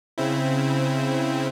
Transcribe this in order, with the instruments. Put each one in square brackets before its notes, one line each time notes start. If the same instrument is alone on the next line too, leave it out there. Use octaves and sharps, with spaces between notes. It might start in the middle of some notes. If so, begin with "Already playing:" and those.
[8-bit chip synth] C#3 C4 E4